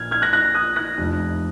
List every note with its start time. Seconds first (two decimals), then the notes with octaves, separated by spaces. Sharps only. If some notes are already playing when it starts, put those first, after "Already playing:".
Already playing: A#1 A#2 F3 F6 G#6
0.11 F6 G#6
0.22 F#6 A#6
0.33 F#6 A#6
0.55 D#6 F#6
0.76 F#6 A#6
0.98 F1 F2 F3